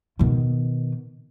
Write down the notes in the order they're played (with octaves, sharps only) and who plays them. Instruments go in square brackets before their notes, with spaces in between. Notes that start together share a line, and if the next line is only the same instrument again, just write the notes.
[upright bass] B2 D#3